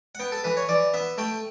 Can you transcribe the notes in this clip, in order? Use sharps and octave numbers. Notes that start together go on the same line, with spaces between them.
F#5
B3 G5
A4
E3 B4
C#5
E3 D5
B3 E5
A3 G5